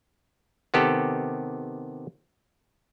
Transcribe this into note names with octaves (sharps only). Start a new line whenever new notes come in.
C3 D#3 B3 G4 A4